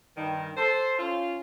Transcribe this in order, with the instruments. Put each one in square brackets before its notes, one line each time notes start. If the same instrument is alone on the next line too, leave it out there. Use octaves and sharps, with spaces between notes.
[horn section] G2 D#3
A4 C5
C#4 F4